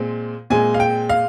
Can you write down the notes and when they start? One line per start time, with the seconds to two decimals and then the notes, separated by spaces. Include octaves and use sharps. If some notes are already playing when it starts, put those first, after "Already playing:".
Already playing: A#2 G#3 C4
0.50 A#2 G#3 C4 G#5
0.74 F5
0.80 G5
1.09 F5